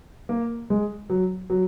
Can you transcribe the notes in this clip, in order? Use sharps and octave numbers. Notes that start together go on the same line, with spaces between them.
A#3
G#3
F#3
F#3